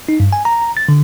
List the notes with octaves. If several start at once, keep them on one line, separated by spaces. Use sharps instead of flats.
D#4
G2
G#5
A#5
A6
D3